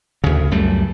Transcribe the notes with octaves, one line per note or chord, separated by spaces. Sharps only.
D2 C#3
C#2 F#2 G3 A3